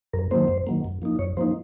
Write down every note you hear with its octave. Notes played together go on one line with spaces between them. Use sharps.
F#2 A#4
D#3 F#3 A#3 C5
F#2
D#3 F#3 A#3
F#2
F3 A#3 D#4
F#2 C#5
F3 A#3 D#4 C5